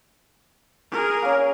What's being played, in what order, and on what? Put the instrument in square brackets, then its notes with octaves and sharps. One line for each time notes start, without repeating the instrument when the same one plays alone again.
[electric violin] G#4 A#4
[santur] A#3 C#4